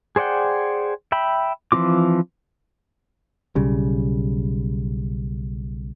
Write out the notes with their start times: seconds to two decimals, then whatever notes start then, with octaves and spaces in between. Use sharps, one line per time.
0.16 G#4 C5 D5 F#5 G5
1.12 E5 G5 B5
1.72 E3 F3 C4 F4 D6
3.55 B1 C#3 G3